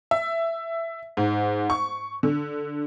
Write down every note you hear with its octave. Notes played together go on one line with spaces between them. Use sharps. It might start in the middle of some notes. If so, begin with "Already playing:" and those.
E5
G#2
C#6
D3